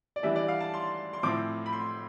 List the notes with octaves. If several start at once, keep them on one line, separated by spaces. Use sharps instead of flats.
D5
E3 G3 D4 E5
D5
F5
A5
C6
C6
A2 F3 C4 D6
B5
C6